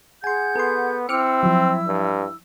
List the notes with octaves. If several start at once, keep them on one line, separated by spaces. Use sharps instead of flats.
G#4 F#5 G#5 C6 G6
B3 A4 C6
C4 E4 D6 E6 F6 C#7
F3 F#3
G2